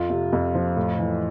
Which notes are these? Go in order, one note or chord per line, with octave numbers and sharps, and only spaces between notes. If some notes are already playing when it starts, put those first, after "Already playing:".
Already playing: F2 F4
C3
F2
F3
A2
E3